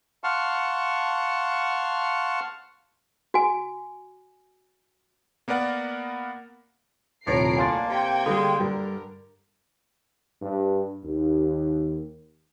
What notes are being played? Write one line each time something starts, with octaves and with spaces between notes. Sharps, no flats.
F5 F#5 A5 C6 C#6 F6
F#4 G#5
A#3 B3 A#4 D5 F#5
D#1 A2 C3 C#5 A#5 C7 D7
A#3 D4 G#5 C6 A6
C3 G5 G#6
D3 G3 G#3
G2 D3 G3 A#4
G2
D#2